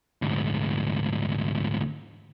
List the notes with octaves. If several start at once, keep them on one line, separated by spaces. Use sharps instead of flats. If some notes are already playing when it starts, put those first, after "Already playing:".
D2 G#2